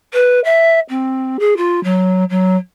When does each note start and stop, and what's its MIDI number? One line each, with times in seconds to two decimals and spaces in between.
0.14 0.40 71
0.45 0.80 76
0.89 1.37 60
1.40 1.57 68
1.57 1.83 65
1.84 2.24 54
2.30 2.56 54